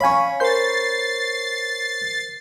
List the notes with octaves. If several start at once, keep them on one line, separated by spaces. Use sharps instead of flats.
C#4 C#5 F5 G#5 B5
A#4 C5 G6 A6 C7